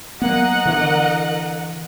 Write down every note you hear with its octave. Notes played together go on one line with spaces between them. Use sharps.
F#3 A#3 B3 A#4 D#5 F#5
D3 E3